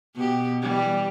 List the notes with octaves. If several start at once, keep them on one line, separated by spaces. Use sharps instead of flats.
B2 G4
E3 G3